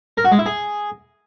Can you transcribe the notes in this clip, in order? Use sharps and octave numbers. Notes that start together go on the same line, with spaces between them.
A#4
F#4
G#3
E4
G#4